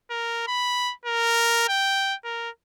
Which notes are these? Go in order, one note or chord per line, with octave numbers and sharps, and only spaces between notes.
A#4
B5
A#4
G5
A#4